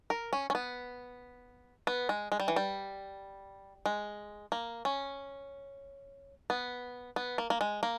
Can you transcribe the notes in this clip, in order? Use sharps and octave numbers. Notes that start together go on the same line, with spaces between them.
A#4
C#4
C#4
B3
B3
G#3
G#3
G3
E3
G3
G#3
A#3
C#4
B3
B3
A#3
A#3
G#3
A#3